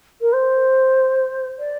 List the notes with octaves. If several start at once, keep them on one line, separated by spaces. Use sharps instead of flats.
A#4
C5
D5